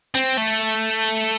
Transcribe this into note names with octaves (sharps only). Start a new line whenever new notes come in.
C4
A3